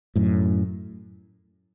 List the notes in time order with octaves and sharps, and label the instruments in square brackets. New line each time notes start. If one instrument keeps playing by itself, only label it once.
[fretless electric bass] F#2 A2